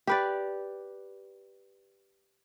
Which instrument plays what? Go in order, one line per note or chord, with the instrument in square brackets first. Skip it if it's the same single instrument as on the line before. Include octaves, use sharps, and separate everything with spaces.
[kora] G4 B4 D5